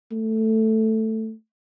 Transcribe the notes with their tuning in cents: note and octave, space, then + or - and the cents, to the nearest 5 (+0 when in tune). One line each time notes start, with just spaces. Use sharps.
A3 +5